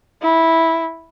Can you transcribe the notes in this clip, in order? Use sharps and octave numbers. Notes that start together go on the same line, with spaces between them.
E4